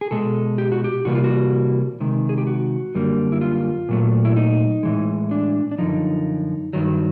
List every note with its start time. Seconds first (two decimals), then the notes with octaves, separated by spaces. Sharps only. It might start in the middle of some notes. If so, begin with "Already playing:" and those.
0.01 G#4
0.11 B2 G#3 A4
0.58 G4
0.72 F#4
0.84 G4
1.05 C3 E3 G3 A#3 F#4
1.15 F4
1.24 F#4
2.00 C3 D#3 G#3
2.29 G#4
2.38 G4
2.47 F#4
2.95 F#2 D3 G3 A#3
3.32 E4
3.41 F4
3.89 A#2 F#3 A3
4.25 E4
4.36 D#4
4.83 A2 E3 G#3
5.31 D4
5.72 D4
5.78 F#2 D3 F3 D#4
6.73 G2 D#3 F#3